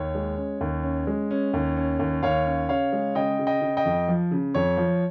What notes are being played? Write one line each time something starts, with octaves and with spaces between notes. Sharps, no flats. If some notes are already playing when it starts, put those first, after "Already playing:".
Already playing: D#2 C#5
G#3
C#4
D#2
C#4
G#3
C#4
D#2
C#4
D#2
D#2 C#5 F5
C#4
C#3 C#5 F5
G#3
C#3 D#5 G5
C#3
D#5 G5
C#3
D#5 G5
F2
F3
C#3
F2 C#5
F3